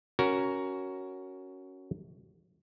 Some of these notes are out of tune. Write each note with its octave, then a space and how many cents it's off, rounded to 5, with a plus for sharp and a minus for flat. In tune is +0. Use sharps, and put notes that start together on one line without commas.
C#4 +0 F#4 +10 A#4 +0